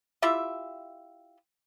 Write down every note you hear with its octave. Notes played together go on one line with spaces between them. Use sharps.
E4 F4 G4 E5